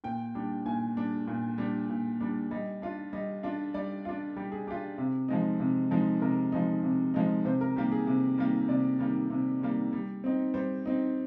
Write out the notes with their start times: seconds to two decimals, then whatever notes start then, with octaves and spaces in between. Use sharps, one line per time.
0.04 A#2 G5
0.35 G3 D4
0.66 A#2 G#5
0.97 G3 D4
1.28 A#2
1.58 G3 D4
1.90 A#2
2.20 G3 D4
2.51 G3 D#5
2.82 D4 F4
3.13 G3 D#5
3.43 D4 F4
3.74 G3 D5
4.05 D4 F4
4.36 G3 G4
4.52 G#4
4.67 D4 G4
4.71 F4
4.98 C3
5.28 F3 G#3 D#4
5.59 C3
5.91 F3 G#3 D#4
6.21 C3 A#4
6.52 F3 G#3 D#4
6.83 C3
7.14 F3 G#3 D#4
7.45 C3 C5
7.61 A#4
7.76 D#3 G3 A#3 G4
7.92 G#4
8.07 C3
8.38 D#3 G3 A#3
8.68 C3 D5
8.99 D#3 G3 A#3
9.30 C3
9.61 D#3 G3 A#3
9.93 G3
10.24 C4 D#4
10.54 G3 C5
10.86 C4 D#4